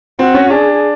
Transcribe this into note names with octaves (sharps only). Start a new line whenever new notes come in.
C4 F#4
C#4
D4 G#4